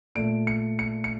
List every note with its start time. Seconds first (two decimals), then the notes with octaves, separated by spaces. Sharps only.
0.15 A#2 A3 D7
0.47 C#7
0.79 C#7
1.04 C#7